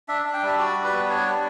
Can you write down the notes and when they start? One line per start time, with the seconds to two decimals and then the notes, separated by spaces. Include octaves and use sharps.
0.08 D4 E5
0.26 D4
0.34 G5
0.43 G3 E5
0.59 F#4 D5
0.76 G3
0.84 B4
0.93 B3
1.09 D4 C#5
1.26 G3